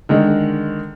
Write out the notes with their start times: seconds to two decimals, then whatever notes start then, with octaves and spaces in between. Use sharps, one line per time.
0.09 D3 D#3 G#3